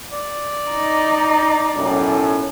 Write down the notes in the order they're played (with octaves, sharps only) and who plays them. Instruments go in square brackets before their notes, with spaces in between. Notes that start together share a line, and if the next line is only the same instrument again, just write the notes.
[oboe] D5
[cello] D#4
[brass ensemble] B1 F#2 A2